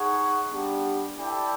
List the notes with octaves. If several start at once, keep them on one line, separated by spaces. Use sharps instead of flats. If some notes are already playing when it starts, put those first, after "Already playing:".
Already playing: D#4 G#4 C#5 F#5
G3 B3 D4 G4
E4 A4 D5 G5